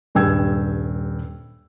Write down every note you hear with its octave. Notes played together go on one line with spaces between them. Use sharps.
D#1 G2 G#4 G5 E6 G#6